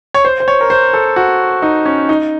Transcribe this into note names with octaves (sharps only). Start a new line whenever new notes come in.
C#5
C5
C5
C#5
A#4
C5
A4
F#4
D#4
C#4
D#4